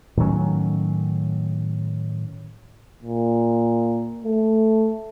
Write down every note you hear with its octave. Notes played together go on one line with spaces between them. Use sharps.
A2 D#3 F#3 C#4
A#2
A3